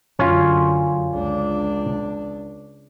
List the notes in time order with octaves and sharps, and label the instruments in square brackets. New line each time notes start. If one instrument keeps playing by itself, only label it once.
[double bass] F#2 D3 [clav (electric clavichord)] C#4 F4
[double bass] C#2 D4